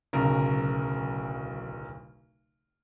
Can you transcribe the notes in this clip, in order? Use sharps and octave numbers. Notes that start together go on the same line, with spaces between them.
D1 B1 C#3 A#4